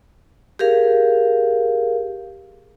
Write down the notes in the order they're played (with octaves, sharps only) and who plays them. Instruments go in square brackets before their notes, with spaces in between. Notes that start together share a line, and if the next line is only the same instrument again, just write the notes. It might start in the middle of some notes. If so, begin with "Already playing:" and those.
[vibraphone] G4 G#4 A#4 F5